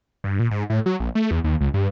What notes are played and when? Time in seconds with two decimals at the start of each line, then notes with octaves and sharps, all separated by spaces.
0.24 G2
0.39 A#2
0.51 G#2
0.70 A2
0.86 F#3
1.00 A#1
1.15 A3
1.31 E2
1.44 D#2
1.61 C#2
1.74 G2